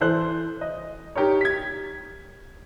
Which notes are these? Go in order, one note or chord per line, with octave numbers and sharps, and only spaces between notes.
E3 A4 C5 F#6
D#5
D#4 G4 A#4 C#5
G#6 B6